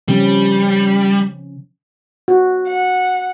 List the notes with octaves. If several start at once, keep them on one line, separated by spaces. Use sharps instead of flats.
C#3 F3 G3 C#4
F#4
F#5